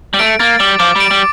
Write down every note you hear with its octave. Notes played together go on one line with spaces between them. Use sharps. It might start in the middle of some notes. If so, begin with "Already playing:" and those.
G3
A3 D7
A#3 A6
G3 D6
F3 D6
G3 D7
G3